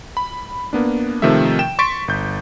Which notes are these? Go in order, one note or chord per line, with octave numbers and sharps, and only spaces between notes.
B5
A#3 B3 D4
C3 D#3 F3 A3 E5
G5 E7
C6 C#6 A6 B6 D7
G1 G6